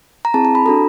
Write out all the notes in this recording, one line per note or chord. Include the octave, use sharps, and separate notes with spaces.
A#5
C4 E4 G#4 A5
A5
B5
D4 F#4 A4 A#5